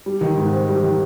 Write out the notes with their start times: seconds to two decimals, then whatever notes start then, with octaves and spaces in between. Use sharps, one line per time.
0.06 G3
0.21 D#3
0.37 G#2
0.53 C4
0.68 G3
0.83 D#3